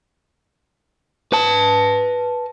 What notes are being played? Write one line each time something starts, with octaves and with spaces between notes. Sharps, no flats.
B4 A5